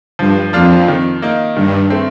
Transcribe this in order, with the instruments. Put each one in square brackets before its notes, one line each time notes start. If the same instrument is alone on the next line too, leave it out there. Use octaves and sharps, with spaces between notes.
[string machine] G2 [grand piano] F3
[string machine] F2 [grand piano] A#3 D4 F4
[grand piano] D#3
A#3 D#4
[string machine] G2 [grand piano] D#3
[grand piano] A3 C4